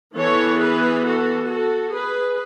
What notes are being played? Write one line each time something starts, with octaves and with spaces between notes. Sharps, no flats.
E3 B3 A4 C#5
G#4 B4
F#4 A4
F#4 A4
G#4 B4